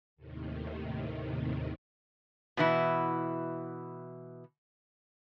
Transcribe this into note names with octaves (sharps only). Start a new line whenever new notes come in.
D#2 A2 C3 D#3
B2 E3 E4